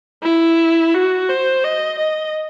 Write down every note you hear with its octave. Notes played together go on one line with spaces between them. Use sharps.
E4
F#4
C5
D#5
D#5